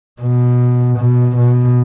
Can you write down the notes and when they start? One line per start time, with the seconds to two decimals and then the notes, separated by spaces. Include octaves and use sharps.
0.22 B2
0.99 B2
1.37 B2